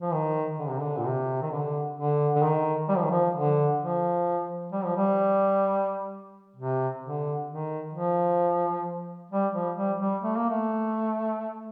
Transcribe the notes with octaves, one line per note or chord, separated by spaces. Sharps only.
F3
D#3
D3
C3
D3
A#2
C3
D#3
D3
D3
D3
D#3
G3
F3
D#3
F3
D3
F3
G3
F3
G3
C3
D3
D#3
F3
G3
F3
G3
G3
A3
A#3
A3